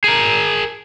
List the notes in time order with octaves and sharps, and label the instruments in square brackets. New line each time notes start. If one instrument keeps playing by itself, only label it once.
[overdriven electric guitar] G#4 A#4